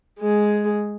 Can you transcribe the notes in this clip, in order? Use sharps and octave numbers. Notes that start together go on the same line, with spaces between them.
G#3 G#4